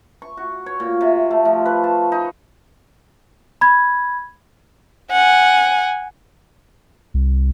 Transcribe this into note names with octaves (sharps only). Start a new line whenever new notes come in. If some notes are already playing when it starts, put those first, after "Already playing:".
C#6
F#4
C#5
A#2
C3
A3
F3
B4
A5
D#4
B5 G#6
F#5 G#5
C2